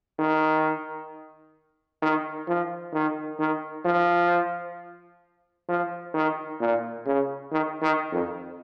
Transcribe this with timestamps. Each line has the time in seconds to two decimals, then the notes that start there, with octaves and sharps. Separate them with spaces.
0.19 D#3
2.02 D#3
2.48 F3
2.93 D#3
3.39 D#3
3.85 F3
5.69 F3
6.14 D#3
6.60 A#2
7.06 C#3
7.52 D#3
7.82 D#3
8.13 F2